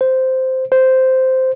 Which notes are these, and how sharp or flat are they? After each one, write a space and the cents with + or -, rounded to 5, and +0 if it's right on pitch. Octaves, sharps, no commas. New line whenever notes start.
C5 -5
C5 -5